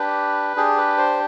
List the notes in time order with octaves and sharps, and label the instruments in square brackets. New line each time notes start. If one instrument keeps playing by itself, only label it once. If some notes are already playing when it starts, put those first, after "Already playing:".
Already playing: [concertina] D4 G4 B4
D4 G4 G#4
B4
C5